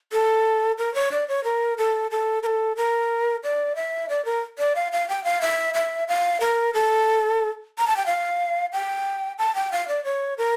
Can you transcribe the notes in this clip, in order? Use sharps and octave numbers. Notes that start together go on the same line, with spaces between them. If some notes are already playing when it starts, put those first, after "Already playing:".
A4
A#4
C#5
D5
C#5
A#4
A4
A4
A#4
A4
A#4
D5
E5
D5
A#4
D5
F5
F5
G5
F5
E5
E5
F5
A#4
A4
A#5
A5
G5
F5
G5
A5
G5
F5
D5
C#5
A#4